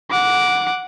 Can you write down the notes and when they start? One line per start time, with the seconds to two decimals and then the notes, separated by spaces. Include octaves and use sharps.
0.11 F#5 D6